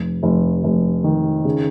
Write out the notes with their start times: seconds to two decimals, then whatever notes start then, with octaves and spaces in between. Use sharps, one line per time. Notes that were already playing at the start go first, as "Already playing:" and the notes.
Already playing: F1
0.23 F1
0.64 F1
1.04 D#3
1.45 C#3